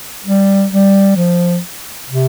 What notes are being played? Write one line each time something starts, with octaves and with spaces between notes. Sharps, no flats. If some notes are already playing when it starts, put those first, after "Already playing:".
G3
G3
F3
C3